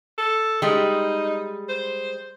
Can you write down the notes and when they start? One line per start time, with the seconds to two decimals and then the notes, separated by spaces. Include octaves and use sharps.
0.18 A4
0.62 G3 G#3 D#4
1.69 C5